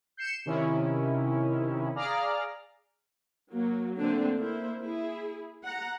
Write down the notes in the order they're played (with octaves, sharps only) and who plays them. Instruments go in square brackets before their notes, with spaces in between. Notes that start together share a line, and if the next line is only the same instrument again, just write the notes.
[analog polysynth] G6 C7 C#7 E7
C3 D#3 C#4 E4
G#4 D5 F5 A#5 F6
[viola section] F#3 A#3
D3 A3 A#3 C4 D4
A#3 E4 C5
E4 G#4
F#5 A#5